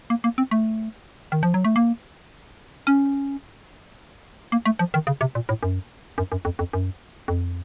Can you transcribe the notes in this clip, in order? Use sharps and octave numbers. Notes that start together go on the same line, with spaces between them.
A#3
A#3
C4
A3
D#3
F3
F#3
A3
A#3
C#4
A#3
A3
F3
D#3
C#3
C3
A#2
A2
F#2
F#2
F#2
F2
F2
F#2
F2